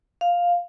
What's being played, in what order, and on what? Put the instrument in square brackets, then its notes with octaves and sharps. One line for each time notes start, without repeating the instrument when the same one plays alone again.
[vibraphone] F5